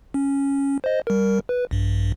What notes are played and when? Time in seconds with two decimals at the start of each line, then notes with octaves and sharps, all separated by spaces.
0.14 C#4
0.84 C5 D#5
1.07 G3 A#4
1.49 B4
1.71 A#1 G2